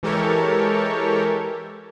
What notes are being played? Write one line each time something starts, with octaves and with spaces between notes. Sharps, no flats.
E3 G#3 G4 A4 A#4 C#5